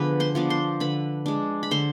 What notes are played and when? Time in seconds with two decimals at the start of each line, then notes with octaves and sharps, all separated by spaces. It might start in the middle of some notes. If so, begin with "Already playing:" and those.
Already playing: D3 F3 B3 D4 G#4 B4 B5
0.20 C5 C6
0.35 F3 B3 D4
0.50 C5 C6
0.80 D3 B4 B5
1.26 G#3 D4
1.63 B5
1.71 D3 C5 C6